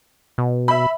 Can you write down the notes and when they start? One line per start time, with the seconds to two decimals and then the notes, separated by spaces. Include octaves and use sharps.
0.38 B2
0.68 E5 B5